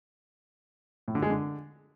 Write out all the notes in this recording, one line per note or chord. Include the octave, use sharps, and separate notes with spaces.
A2
D3
G#3
D3